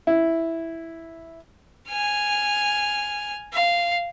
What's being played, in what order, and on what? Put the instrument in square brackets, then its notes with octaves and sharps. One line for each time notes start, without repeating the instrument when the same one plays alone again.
[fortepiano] E4
[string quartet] G#5 F6
F5